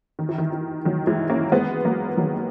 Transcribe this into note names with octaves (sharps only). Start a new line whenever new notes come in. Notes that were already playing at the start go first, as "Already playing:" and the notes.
D#3
E3
D#3
E3
D#3 F#3
E3 G#3
A#3 C#4
G#3 B3
F#3 A#3
D#3 F#3